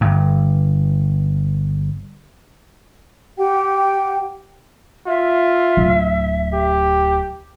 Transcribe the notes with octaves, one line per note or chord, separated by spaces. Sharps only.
G1 G2
G4 F#5 G5
F4 E5
D1
G4